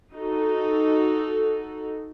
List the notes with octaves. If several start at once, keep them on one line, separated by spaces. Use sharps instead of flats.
D#4 F#4 A4